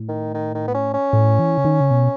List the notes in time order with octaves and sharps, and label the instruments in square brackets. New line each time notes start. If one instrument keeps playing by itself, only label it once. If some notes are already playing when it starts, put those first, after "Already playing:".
Already playing: [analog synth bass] A2
[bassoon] D#3
D#3
D#3
B3
C#4
C#4
[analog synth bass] A2
E3
C#3
D#3
C#3
B2